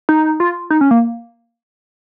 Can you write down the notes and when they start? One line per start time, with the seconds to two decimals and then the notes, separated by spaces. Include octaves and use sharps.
0.09 D#4
0.40 F4
0.70 D#4
0.81 C#4
0.91 A#3